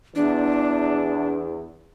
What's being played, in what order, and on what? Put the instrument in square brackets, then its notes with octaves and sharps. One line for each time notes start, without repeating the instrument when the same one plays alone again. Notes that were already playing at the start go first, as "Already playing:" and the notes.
[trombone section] E2 [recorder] D4